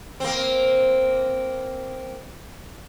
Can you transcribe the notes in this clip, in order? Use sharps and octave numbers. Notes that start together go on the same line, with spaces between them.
A#3 C4